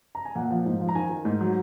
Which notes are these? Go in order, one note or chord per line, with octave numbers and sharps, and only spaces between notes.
A#5
G#5
A#2 F#5
F3
G#2
F3
A#5
D#3 G#5
D#3
G#2
F#3